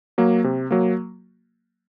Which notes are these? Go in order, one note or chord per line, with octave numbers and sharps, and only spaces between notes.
F#3 A#3
C3
F#3 A#3